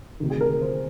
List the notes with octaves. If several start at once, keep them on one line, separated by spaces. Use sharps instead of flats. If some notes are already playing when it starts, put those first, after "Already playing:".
D2 C3 D#3
G#4
A#4
C5